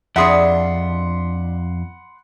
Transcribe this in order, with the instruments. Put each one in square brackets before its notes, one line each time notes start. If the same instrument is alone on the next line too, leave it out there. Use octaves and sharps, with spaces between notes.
[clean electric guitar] F2 [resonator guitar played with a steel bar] D4 G#4 E5 [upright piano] F#5 B5 C6